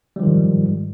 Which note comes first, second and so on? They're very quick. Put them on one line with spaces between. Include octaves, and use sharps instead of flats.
G3 F3 D#3 G#2